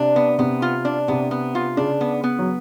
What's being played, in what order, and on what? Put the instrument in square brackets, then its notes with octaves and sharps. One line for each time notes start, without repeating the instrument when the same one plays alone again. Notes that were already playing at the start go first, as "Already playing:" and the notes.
Already playing: [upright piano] C3 [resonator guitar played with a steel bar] D4
[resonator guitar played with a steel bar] B3
[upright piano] C3 [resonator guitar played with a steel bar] B3
[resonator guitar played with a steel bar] F4
D4
[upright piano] C3 [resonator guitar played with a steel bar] B3
[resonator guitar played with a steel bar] B3
F4
[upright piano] C#3 [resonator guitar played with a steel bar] D4
[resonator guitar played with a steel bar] B3
B3
[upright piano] F#3